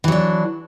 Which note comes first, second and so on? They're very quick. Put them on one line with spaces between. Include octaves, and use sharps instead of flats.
E3 F#3 D4